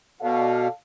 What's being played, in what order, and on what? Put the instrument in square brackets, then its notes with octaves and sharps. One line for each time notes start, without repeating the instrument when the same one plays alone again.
[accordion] B2 [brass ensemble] A4 D5 F5